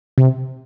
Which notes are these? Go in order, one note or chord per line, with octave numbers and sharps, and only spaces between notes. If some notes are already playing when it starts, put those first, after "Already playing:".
C3